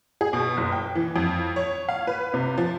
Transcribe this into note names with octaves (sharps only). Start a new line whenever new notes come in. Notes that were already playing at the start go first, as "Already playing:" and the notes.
G#4
B2
F#1
G5
E3
F2
C#5
F5
B4
C3
F3